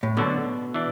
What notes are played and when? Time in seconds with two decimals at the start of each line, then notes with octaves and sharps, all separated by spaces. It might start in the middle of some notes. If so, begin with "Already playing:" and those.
0.03 A2
0.17 B2 D3 F#3 D4 F#4
0.74 E3 D4